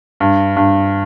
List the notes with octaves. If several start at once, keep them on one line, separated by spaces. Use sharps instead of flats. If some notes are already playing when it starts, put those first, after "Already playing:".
G2
G2